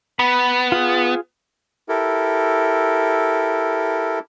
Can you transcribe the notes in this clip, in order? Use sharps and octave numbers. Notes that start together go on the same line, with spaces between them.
B3 B5
F4 G#4
E4 G4 A4 A#4